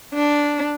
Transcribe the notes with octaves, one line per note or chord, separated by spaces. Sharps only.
D4